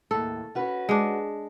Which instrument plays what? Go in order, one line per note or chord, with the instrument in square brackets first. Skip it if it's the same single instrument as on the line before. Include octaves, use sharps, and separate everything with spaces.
[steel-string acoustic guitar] D#2 A2 [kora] A4
[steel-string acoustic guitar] C#4 F#4 B4
[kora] G#3 D4